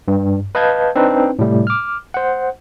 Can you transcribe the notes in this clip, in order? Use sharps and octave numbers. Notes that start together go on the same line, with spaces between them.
G2
B4 D#5 F5 A5 G6 G#6
C4 D4 D#4 B4
A2 C3 G3 A3
D6 F6
C5 F#5